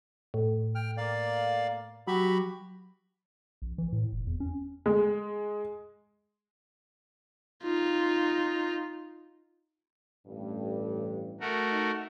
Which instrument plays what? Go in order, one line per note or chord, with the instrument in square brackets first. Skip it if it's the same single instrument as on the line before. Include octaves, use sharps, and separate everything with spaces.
[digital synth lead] A2
[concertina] G5 F6
A#3 D5 F5
[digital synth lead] F#3 [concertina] F#4 G4 B5
[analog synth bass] A#1
E3
A2
F1
E2
C#4
[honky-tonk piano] G#3
[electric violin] D#4 F4
[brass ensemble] A1 G2
[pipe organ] A3 F#4 A#4
[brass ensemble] D#4